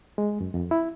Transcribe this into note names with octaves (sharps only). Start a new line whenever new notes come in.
G#3
F#2
F2
E4